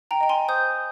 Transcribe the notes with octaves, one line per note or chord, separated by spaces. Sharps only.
G5 A#5
D#5 G5
G#5 C6
C5 D#6 G6